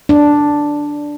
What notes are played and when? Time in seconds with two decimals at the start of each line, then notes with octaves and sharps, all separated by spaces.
0.09 D4